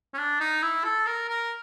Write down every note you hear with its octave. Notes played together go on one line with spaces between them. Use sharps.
C#4
D4
D#4
E4
A4
A#4
A#4